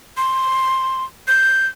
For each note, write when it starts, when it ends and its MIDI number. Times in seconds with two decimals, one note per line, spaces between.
0.17 1.04 84
1.28 1.67 91